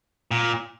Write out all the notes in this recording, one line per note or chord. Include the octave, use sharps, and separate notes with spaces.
A#2